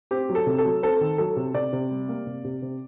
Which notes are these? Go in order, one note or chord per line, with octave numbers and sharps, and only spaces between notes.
C4 G4
F#3
A4
C3
A4
F#3
C4 A4
D#3
F#3 A4
C3
C3 D5
C3
G3
A#3
C3
C3
C3